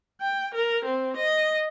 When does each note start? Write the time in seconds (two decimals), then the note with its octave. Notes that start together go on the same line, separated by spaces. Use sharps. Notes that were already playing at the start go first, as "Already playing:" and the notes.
0.21 G5
0.54 A#4
0.84 C4
1.16 D#5